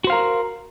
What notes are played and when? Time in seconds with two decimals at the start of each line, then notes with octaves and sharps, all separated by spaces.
0.04 F#4
0.07 C5
0.10 F5
0.12 A#4